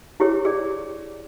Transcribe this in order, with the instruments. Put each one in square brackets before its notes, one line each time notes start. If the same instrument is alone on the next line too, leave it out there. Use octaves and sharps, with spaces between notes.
[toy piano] E4 G4 G#4 C#5
G#4 D5